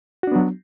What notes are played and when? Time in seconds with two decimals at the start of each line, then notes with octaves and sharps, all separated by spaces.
0.23 F#4
0.27 D4
0.32 B3
0.36 F#3